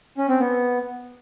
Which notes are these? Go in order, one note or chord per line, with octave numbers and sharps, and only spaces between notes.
C#4
C4
B3